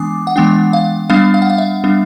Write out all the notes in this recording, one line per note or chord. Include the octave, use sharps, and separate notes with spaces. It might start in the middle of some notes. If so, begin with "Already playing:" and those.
Already playing: E3 G#3 B3 D4 G#5 D6 D#6
F#5
E3 G#3 B3 D4 G5
F5
G3 B3 D4 F5
F5
F#5
F5
E5
G3 B3 D4